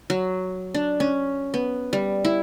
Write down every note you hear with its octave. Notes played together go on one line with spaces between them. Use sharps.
F#3
D4
C#4
B3
G3
E4